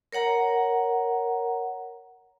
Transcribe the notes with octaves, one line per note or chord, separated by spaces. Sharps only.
A#4 C#5 F#5 A#5